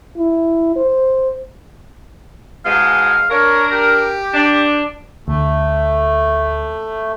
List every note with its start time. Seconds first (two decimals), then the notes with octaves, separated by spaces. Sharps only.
0.17 E4
0.76 C5
2.65 G#2 B2 G#3 F5
3.31 D4 A#4 C#5
3.72 G4
4.34 D4
5.28 D2 A3